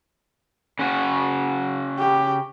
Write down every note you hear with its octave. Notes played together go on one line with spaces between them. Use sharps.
C#3 F#4
G4